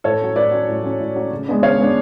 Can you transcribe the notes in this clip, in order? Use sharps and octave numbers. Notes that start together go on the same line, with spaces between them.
A2 A4 C#5
F#3 C#4
A2 B4 D5
F#3 C#4
A2
F#3 C#4
A2
F#3 C#4
C#3
G#3 B3 D4
C#3 C#5 F5
G#3 B3 D4